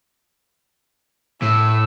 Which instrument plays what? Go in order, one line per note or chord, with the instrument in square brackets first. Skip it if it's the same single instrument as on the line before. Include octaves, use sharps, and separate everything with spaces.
[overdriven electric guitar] A2 [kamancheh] E6